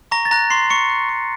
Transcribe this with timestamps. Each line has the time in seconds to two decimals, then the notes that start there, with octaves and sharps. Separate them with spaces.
0.11 A#5 C#6 A#6
0.25 A6
0.31 A#5 F#6 A#6
0.50 C6 C#6 C7
0.70 C#6 C#7
0.90 F#6
1.09 C#6